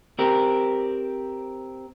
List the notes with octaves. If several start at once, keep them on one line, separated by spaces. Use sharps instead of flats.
C4 G4 A#4